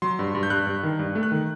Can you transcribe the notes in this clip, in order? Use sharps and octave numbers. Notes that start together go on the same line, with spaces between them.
F#3 C6
G2
G2
G6
G2 F#6
G2
D#3
G2
A3
F#6
D#3